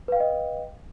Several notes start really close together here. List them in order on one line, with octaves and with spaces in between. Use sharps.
B4 F5 G5 D#5